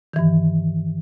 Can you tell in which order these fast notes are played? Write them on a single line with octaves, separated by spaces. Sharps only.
D#3 E3 G2